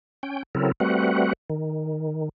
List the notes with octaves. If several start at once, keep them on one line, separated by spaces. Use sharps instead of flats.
C#4 G5
C#3 F#3 C4 E4 A4 A#4
G3 A3 C4 F#4 B4 F#5
D#3